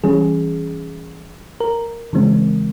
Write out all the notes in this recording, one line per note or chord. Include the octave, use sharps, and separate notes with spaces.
E3 G3 C#4 G#4
A#4
C#3 E3 G#3 C4